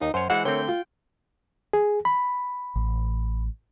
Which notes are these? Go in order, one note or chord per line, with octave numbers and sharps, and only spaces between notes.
D#2 D#4
F#2 C5 C#5
E3 G#3 C5 E5 F#5
D3 A3 C4 A#4 C#5 G5
F4
G#4
B5
A1